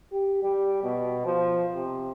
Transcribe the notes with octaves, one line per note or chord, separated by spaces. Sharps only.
G4
G3
B2
F3
C3